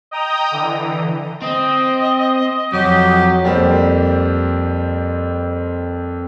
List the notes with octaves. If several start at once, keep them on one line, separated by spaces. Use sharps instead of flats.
D#5 G5 A#5 D#6
D3 E3
C4 D#5
F2 F#3 G4
F2 G3 A#3 C4